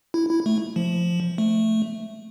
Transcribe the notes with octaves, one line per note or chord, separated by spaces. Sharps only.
E4
E4
A3
F3
A3